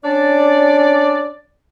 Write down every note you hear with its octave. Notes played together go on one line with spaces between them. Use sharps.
C#4 D4 D5